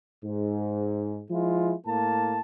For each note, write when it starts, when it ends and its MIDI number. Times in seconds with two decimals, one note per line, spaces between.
0.23 1.21 44
1.30 1.73 53
1.30 1.73 56
1.30 1.73 64
1.30 1.73 65
1.84 2.39 45
1.84 2.39 58
1.84 2.39 81